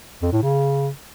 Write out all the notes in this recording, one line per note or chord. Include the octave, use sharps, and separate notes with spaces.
F2
A2
C#3